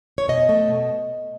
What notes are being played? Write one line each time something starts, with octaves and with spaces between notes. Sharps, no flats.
C#5
B2 D#5
A3
B2